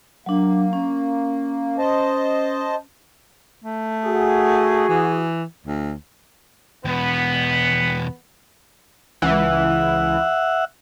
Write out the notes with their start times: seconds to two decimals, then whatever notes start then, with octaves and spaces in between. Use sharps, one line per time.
0.26 F#3 A#3 D4
0.73 C#4
1.78 C5 D#5 A5
3.64 A3
4.06 F#4 G#4
4.89 E3
5.67 D2
6.85 E2 B2 B3
9.22 C#2 E3 E5 F#5